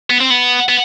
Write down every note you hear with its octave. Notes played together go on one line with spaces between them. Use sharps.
B3
C4
B3
B3